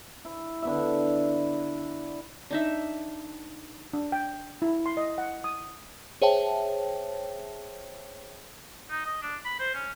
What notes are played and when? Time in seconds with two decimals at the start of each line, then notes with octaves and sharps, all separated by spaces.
0.25 E4
0.62 D3 B3 E5
2.51 D4 D#4 E5
3.93 D4
4.12 G5
4.62 E4
4.86 C6
4.97 D#5
5.18 F#5
5.44 D#6
6.22 G#4 C5 C#5 E5 G5 A5
8.90 D#4
9.05 D#5
9.22 D4
9.45 B5
9.60 C5
9.74 C#4